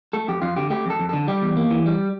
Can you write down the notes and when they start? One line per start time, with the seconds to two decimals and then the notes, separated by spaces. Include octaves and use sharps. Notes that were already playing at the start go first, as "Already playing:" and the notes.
0.13 A3 A4
0.28 F2 G4
0.42 F2 F4
0.56 D3 G4
0.70 A3 G4
0.86 F2 A4
1.00 F2
1.09 D3 A4
1.28 G3 G4
1.42 E2
1.57 A#3
1.71 E3
1.86 G3